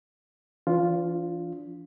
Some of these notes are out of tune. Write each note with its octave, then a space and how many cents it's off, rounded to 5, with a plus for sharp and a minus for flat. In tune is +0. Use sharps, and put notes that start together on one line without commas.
E3 +40 D4 -30 F4 +0